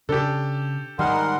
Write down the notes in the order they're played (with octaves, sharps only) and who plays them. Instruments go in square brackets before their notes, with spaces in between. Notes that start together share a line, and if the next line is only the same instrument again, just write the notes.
[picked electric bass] C#3 [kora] D4 C#5 D5 [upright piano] G4 A4
[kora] G#2 G3 G#3 [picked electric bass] D#3 [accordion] A#4 F#5 C6